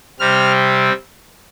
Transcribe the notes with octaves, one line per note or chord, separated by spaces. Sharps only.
C3 G3 C4 F6